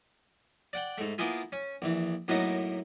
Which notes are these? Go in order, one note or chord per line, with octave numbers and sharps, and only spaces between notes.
D5 F#5 G5
G#2 A3
A#3 B3 E4 F4 G#4
C#4
A#1 E3
F#2 A2 F#3 A#3 B3 D#4